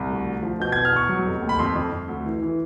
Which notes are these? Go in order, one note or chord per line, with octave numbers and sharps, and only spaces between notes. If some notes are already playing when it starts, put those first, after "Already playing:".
Already playing: C2
D2
D2
F3
B2 G6
E2 G#6
F6
E2 C#6
F#3
F1
D#2
B5
F2 C6
F2
F2
D2
E3
E3